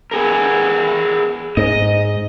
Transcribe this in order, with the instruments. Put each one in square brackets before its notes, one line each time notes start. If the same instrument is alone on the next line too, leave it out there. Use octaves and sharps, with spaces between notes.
[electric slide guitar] B3 G#4 A#4
[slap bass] G#2 [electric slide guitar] D#5